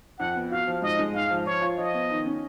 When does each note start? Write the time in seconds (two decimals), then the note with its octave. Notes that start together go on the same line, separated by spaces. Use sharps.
0.19 F2 F#5
0.36 B3
0.51 F#4 F5
0.67 F3
0.82 G#2 D#5
0.99 G#3
1.14 G#2 F5
1.31 F3
1.46 F3 C#5
1.62 F4
1.78 F3 D#5
1.94 B3
2.10 D#3
2.26 C#4